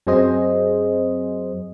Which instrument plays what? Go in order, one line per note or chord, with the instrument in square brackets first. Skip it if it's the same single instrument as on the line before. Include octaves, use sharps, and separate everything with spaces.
[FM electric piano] F#2 F#3 C4 G#4 C5 D#5